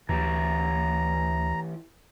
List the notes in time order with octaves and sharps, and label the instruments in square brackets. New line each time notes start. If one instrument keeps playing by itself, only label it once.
[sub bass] D2 [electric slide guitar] E3 G4 [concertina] A#5